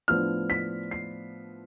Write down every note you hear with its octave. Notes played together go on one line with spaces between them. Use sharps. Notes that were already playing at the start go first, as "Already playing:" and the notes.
A2 F3 B3 D4 F6
B6
C7